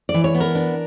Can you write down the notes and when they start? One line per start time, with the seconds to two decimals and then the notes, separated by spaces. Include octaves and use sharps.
0.09 D5
0.14 E3
0.24 C#5
0.35 B3
0.40 A#4
0.55 D4